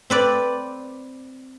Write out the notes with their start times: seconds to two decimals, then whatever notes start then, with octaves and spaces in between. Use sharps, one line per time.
0.10 C4 B4 D5